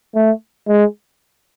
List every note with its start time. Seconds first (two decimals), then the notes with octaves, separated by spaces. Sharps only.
0.15 A3
0.68 G#3